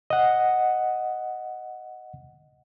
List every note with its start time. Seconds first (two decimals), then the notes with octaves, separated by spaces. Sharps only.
0.10 D#5 F#5